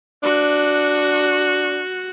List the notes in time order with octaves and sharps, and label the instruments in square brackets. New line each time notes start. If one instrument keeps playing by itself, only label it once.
[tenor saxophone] D4 [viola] F#4